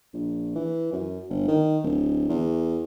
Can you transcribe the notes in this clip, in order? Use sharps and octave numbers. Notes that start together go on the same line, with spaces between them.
A#1
E3
F#2
G1
D#3
D1
E2